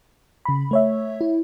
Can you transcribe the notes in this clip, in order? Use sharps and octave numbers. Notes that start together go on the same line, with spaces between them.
C#3 B5
A3 C#5 E5
E4